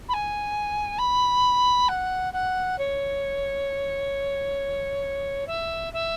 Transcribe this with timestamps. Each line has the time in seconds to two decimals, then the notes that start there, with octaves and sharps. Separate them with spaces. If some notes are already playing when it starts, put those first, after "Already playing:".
0.08 B5
0.13 G#5
0.98 B5
1.88 F#5
2.33 F#5
2.78 C#5
5.47 E5
5.93 E5